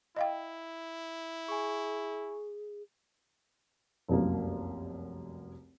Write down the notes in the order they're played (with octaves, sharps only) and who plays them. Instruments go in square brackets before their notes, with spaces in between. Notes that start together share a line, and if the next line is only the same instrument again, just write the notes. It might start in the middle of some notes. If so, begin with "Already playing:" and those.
[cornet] E4 [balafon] D#5 F5 G5
[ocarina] G#4 [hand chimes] G#5 C#6
[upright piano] F1 C2 F#2 A#3